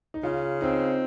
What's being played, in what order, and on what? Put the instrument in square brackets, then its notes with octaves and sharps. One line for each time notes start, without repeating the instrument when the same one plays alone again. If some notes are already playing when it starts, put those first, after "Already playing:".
[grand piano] D#4
[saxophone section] C#3 [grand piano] F4
[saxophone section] C4 [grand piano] D#4